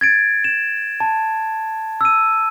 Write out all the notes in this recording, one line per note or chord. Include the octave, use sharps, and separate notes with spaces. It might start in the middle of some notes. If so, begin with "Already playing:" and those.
G#6 A6 D7
E7
A5
E6 D#7